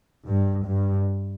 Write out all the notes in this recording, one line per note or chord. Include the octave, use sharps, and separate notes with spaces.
G2
G2